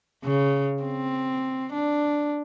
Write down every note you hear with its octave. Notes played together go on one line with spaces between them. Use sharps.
C#3
C4
D4